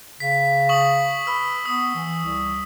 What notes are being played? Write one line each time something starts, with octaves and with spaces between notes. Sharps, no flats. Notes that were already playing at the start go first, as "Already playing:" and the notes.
C#3 B6
C#6 D#6 F#7
B4 E6
B3 D#6
E3
C2